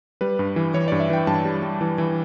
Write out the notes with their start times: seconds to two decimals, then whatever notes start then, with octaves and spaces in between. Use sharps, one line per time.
0.21 G3 B4
0.39 G2
0.56 E3
0.74 E3 C#5
0.88 D5
0.92 G2
1.00 E5
1.10 E3 G5
1.27 G2 A5
1.45 G3
1.62 G3
1.81 E3
1.98 E3